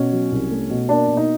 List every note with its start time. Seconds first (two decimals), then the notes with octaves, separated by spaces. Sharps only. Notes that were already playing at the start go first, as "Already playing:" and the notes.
Already playing: B2 C#4
0.12 F#3
0.32 C2
0.51 A3
0.70 B2
0.89 A#3 D4
1.08 B2
1.17 D#4